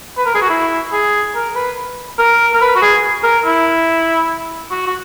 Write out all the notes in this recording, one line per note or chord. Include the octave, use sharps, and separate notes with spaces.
B4
A#4
G#4
F#4
E4
G#4
A#4
B4
A#4
A#4
B4
F#4
G#4
A#4
E4
F#4
F#4